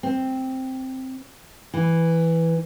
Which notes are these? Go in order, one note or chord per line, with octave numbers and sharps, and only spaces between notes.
C4
E3